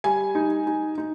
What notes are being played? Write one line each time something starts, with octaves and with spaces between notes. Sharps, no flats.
G3 G#5
D#4
D#4
D#4